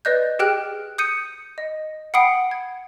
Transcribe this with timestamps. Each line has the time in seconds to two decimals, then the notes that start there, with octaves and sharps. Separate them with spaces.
0.05 B4 D5 D#5 F#6 G6
0.39 G4 G#4 G5 F6 F#6
0.98 D#6 G6 C#7 D#7
1.58 D#5
2.14 F#5 G5 B5 D#6 C7 D7
2.51 G#6